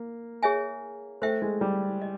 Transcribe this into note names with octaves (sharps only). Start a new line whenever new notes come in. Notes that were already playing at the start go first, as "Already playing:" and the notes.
Already playing: A#3
G#4 C#5 E5 G#5
A3 C5 E5 G5
G#3
G3
D#5